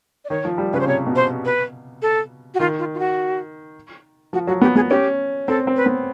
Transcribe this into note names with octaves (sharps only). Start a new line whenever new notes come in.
D5
D#3 C#5
F3
G3
C#3 B4
C5
C3 C#5
B2
C5
B4
A4
F#4
D#3 F4
F4
F4
F#4
F3 F#4
F#3 F#4
B3 G4
B3 G#4
C#4 G4
C4 A4
C4
B4
B3